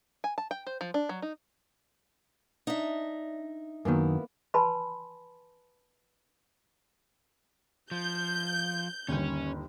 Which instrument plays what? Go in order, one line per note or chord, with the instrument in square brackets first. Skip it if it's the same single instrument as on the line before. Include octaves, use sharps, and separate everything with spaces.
[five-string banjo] G#5
A5
G5
C5
F3
D4
F#3
D#4
[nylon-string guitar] D4 [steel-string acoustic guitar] D#4 E5
[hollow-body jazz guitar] F#2 D#3 [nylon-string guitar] A#3 B3 E4
[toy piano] B4 G#5 A5 B5 C6
[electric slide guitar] F3 [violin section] G6
[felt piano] G1 D#2 [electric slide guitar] C#4 C#5